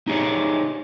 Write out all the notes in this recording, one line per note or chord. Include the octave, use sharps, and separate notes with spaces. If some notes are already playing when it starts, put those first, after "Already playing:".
D#4 G4 G#4 C#5 D5